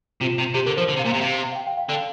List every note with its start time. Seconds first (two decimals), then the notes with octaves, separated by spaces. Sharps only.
0.21 C3 F4
0.38 C3
0.54 C3 G4
0.66 D3 A#4
0.77 F3 C5
0.88 D3 C5
0.97 C3
0.99 F5
1.06 A#2
1.11 C3 F5
1.21 C3
1.52 F5
1.55 G5
1.67 G5
1.77 F5
1.89 D3 F5